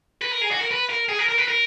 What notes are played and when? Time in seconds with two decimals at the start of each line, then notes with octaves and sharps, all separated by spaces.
0.22 B4
0.32 A#4
0.42 G#4
0.51 F#4
0.60 A#4
0.71 B4
0.90 A#4
1.09 G#4
1.19 A#4
1.29 A#4
1.38 B4
1.48 A#4